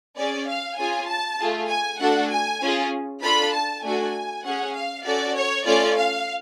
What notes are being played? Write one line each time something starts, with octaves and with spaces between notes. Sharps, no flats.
C#4 G#4 D5
F5
C#4 F4 G#4 G#5
A5
A3 F4 G#4
G#5
A3 D4 F#4 A4 F#5
G#5
C#4 F4 G#4
D4 F4 A4 B5
A5
A3 D4 F#4 G#5
C#4 G#4 F#5
F5
C#4 F#4 A4 D5
C#5
A3 C#4 F4 A4 D5
F5